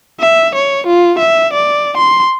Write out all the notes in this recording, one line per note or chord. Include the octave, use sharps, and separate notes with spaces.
E5
C#5
F4
E5
D5
C6